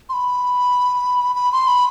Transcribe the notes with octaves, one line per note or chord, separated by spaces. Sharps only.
C6
B5
B5
C6
B5